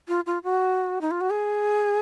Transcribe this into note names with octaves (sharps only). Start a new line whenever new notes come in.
F4
F4
F#4
D#4
F4
F#4
G#4